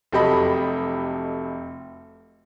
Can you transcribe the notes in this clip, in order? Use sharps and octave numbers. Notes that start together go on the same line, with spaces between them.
F1 F#3 G4 A4 D#5 B5